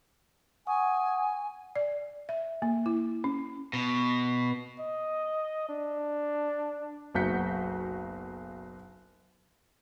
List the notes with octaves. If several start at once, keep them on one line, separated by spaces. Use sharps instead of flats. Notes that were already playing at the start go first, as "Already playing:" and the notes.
F#5 G#5 C#6 D#6
D5
E5
A#3
E4
C#4
B2
D#5
D4
F#1 B1 F#4 G6 B6 C#7